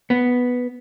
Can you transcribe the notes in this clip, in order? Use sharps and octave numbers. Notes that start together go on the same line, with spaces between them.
B3